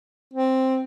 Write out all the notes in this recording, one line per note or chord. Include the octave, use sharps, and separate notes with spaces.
C4